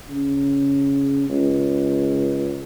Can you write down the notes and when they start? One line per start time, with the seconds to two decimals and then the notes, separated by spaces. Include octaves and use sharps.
0.10 C#3
1.29 C#2